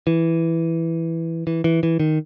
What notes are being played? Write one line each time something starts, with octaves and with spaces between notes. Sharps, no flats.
E3
E3
E3
E3
D#3